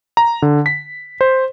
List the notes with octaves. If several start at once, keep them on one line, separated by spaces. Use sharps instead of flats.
A#5
D3
B6
C5